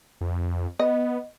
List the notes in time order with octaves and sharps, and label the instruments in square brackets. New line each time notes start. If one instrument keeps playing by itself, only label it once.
[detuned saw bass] F2
[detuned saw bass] B3 [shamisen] D#5